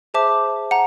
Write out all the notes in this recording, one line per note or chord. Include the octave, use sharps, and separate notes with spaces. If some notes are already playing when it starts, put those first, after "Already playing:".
G#4 C5 E5 A5 D6
F#5 A#5